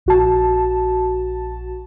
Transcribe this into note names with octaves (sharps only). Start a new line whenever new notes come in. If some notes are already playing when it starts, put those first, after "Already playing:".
A#1 F#4 A5